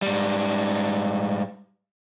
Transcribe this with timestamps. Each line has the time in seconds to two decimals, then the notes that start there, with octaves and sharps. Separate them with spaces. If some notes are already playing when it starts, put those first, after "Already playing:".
0.02 G#2 G3